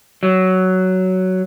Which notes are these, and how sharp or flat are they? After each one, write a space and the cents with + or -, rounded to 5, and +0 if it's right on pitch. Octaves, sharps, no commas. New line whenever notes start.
F#3 +10